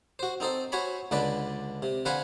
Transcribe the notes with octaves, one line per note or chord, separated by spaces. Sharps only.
F#4 C5
C4 D#4 A4 C5
F#4 C5 C#5 G#5 B5
C#2 D3 D4 B4 D5
C3
D3 B4 C5 F5 F#5 G#5